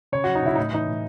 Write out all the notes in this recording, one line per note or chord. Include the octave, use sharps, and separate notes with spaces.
C#3 C#5
F#3 F#4
D#4
C#3 E4
A2 D#4
E3 D#4
A2